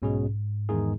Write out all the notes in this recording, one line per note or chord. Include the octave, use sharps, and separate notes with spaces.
B1 G#2 B2 G#3 C#4 G#4
E2 D#3 G#3 D#4 G#4